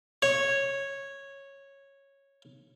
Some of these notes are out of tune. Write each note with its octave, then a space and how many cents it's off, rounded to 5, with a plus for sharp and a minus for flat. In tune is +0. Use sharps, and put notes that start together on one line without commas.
C#5 -10